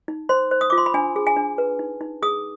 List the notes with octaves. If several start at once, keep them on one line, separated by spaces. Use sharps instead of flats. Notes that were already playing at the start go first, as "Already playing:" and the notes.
D#4
C5 C6
C5
D#6
F4 D6
C6
B5
D4 G#5
G#4
G#5
D4
B4
D#4
D#4
G#4 D#6